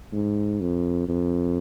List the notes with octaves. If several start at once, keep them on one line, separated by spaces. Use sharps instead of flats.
G#2
F2
F2